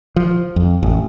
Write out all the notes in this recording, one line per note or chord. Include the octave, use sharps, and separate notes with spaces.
F3
F2
A1